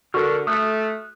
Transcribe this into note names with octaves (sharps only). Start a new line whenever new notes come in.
D3 F#4 A4 A#4 C#6 F6
A3 D#6 F6 F#6